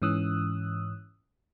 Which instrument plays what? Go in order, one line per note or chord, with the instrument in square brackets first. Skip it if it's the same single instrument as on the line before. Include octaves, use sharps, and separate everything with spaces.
[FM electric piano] G#2 E3 C#4 D#6 E6 F#6